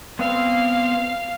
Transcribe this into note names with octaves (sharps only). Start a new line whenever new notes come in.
B3 C4 F5